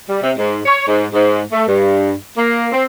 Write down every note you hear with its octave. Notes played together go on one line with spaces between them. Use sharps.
G3
C3
G#2
C#5
G#2
G#2
A3
G2
A#3
C4